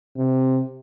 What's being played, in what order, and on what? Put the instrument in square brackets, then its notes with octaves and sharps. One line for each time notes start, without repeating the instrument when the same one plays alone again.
[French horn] C3